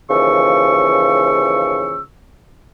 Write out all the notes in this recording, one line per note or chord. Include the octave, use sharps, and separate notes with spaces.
D#2 C#3 E3 F3 C#6 E6